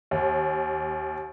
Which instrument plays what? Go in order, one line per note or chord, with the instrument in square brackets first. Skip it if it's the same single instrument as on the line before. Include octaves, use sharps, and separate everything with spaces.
[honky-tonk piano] D#2